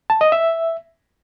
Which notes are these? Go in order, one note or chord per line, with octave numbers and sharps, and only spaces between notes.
A5
D#5
E5